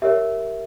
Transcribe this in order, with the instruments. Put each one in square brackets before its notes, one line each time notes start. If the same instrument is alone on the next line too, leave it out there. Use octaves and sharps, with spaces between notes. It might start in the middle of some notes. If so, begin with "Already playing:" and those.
[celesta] G4 A#4 C#5 E5